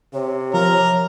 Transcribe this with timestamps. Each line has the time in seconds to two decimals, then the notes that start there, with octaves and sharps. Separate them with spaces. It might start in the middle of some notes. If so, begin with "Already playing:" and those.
0.14 C3 C#5
0.54 F3 A#4